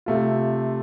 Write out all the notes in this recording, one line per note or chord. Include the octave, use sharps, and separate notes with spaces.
C3 A3 F4